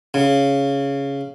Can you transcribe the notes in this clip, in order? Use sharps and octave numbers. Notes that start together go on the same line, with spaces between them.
C#3